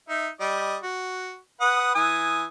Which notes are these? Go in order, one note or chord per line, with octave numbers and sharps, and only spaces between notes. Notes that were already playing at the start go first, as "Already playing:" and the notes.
D#4 E5
G3 D5 D#5
F#4
B4 F#5 D#6
E3 G#5 D#6